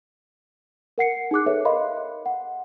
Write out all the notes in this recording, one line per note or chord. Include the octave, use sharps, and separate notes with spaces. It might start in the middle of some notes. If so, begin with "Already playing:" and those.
A#4 F#5 C7 C#7
D#4 G#4 D6 F#6
G#4 A4 B4 C#5 E5
A#4 D#5 F5 B5 C6
F#5